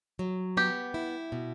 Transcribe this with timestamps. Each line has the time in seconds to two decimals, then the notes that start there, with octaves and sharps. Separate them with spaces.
0.19 F#3
0.57 B3 G4
0.94 E4
1.32 B2